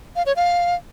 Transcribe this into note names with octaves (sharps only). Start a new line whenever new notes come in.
F5
C#5
F5